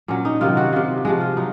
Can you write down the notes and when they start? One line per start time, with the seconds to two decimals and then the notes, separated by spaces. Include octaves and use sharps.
0.08 A#2 F#3 C#4
0.25 D#4
0.41 C3 D#3 F#3 F4
0.57 F#4
0.72 C3 F#3 F4
1.05 C3 F3 G#3 F#4
1.21 F4
1.37 F#3 D#4